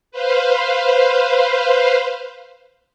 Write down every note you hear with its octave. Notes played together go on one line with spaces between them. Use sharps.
B4 C5 F5